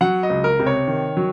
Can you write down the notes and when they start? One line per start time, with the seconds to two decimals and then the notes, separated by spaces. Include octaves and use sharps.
0.01 F#3 F#5
0.23 D#5
0.30 C#2
0.44 A#4
0.60 C3
0.66 C#5
0.88 D#3
1.17 F#3